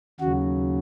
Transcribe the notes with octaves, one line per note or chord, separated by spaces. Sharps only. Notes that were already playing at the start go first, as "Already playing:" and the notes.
D#2 C#3 F#3 F#4